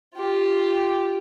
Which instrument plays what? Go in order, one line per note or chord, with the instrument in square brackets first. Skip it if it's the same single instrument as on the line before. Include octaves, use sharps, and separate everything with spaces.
[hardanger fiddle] F4 G4